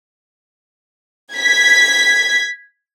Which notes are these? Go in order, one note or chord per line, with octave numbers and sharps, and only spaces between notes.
G#6 B6